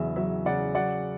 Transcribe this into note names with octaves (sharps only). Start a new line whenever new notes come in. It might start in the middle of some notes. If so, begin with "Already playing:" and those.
Already playing: E2 C#3 F#3 E5
F#3 E5
C#3 D5 F#5
F#3 D5 F#5